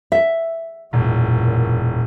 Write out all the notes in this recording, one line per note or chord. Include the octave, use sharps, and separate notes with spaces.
E5
E1 F#2 A#2